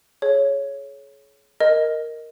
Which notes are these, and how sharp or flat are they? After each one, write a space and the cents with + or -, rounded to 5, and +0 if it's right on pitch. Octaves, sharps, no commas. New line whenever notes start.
G#4 +40 C#5 +0
A#4 +0 D#5 +0